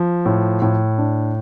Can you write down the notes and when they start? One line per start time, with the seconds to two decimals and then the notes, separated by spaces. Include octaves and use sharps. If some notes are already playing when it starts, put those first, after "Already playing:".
Already playing: F3
0.26 A2
0.62 A2
0.98 D4